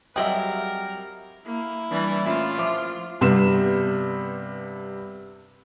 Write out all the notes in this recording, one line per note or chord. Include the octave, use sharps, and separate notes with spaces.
F#3 G3 C4 G#4 A#4 D#5 E5 G5
A#3 E4
E3 G3 D4
A#2 A3 C#4 F4
F3 E5 D6
G2 C3 B3 C6 E7